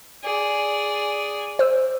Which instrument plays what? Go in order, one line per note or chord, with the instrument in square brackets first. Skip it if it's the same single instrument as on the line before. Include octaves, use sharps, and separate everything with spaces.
[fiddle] G#4 D5
[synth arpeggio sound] C5 E6